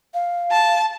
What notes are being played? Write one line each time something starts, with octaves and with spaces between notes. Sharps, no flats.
F5
A5